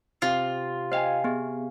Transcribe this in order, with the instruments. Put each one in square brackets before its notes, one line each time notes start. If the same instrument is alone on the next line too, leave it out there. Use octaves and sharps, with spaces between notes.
[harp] C3 [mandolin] F4
[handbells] C5 D#5 G5 [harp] F5 G#5
[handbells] B3 G#4